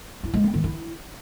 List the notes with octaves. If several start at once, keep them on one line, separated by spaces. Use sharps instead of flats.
E4
G#3
B3
D#3
E4